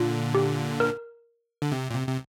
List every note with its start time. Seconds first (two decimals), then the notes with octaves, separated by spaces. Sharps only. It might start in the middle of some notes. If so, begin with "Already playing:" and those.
Already playing: A#2 D3 F4
0.35 G4
0.80 A#4
1.62 D3
1.72 C3
1.90 A#2
1.95 C3
2.08 C3